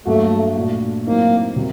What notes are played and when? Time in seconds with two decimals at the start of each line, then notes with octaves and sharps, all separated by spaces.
0.05 G2 F#3 A3 A#3 F#4
0.56 A#2 A3 D4 F#4
1.06 A2 F#3 A#3 C4 D#4
1.56 C3 G3 C4 F#4